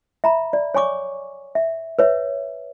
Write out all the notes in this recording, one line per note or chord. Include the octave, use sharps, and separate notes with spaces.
E5 A#5 B5
D5
C#5 G#5 C#6 D6
E5
B4 C#5 E5